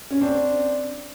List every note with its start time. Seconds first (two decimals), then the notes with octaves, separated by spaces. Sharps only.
0.10 C#4
0.21 C4 D4